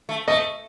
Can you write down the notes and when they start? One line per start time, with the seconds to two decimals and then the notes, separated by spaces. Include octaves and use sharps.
0.09 A3
0.28 A3 D#5